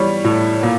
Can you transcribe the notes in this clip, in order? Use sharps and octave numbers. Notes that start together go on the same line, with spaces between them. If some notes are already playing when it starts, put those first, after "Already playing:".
Already playing: E3 G3 C#5
A2
A#2